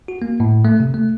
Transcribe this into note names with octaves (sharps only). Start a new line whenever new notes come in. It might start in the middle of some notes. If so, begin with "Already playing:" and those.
F#4
A#3
A2
A3
C3
A3